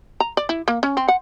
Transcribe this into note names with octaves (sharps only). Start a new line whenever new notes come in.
A#5
D5
E4
A#3
C#4
C4
F#5